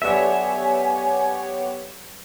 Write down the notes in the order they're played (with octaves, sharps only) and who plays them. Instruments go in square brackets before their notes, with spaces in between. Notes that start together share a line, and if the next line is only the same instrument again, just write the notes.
[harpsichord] B1 D4 C#6 [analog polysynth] B3 G4 C#5 [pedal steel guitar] E5 [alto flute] G#5